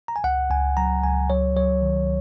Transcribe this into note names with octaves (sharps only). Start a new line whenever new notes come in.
A#5
G#5
C#2 F#5
C#2 G#5
F#3 A#5
C#2 G#5
F#3 C#5
F#3 C#5
D#3